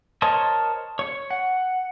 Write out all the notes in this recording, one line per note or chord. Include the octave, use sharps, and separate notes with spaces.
A#4 C5 C#5 D#5 A5
C#5 C#6
F#5